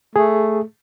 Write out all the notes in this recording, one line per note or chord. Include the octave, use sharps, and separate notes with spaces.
A3 G#4